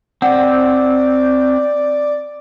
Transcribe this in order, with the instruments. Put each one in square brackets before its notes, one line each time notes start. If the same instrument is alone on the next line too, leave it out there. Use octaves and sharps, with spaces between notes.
[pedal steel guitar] C4 [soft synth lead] D5 [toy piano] F#5